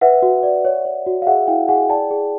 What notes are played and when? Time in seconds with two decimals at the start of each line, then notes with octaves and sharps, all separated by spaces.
0.01 B4 E5 F#5
0.22 F#4
0.43 D5
0.65 C#5
0.85 C#5
1.06 F#4
1.22 F5
1.27 G#4 E5 F#5
1.48 E4 F5 G5
1.68 G#4 F#5 G#5
1.89 D5 G5 A5
2.11 G#4